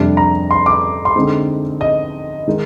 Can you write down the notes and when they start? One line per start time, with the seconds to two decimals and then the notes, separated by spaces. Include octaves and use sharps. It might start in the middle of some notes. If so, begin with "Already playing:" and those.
Already playing: F2 C3 G3 D4
0.17 A#5
0.51 C6
0.66 D6
1.05 C6
1.16 D3 G#3 C4 D#4
1.81 D#5
2.48 D#3 G#3 D#4